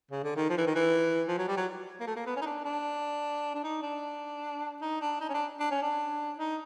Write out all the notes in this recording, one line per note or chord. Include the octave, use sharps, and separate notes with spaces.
C#3
D3
D#3
F3
E3
D#3
E3
F3
F#3
G3
F#3
A#3
A3
A#3
B3
C#4
D#4
D4
D4
D4
D#4
D4
D#4
D4
D#4
C#4
D4
D4
C#4
D4
D#4